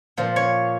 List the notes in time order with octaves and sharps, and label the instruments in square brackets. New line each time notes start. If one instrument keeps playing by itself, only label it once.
[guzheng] A#2 F3
C#5